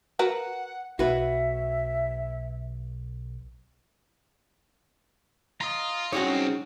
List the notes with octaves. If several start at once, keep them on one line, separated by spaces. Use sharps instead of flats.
F#4 A#4 B4 F#5
B1 F#4 B4 E5
F4 D#5 A#5
C2 F#3 C4 C#4 D#4 F#4 G#4 C#5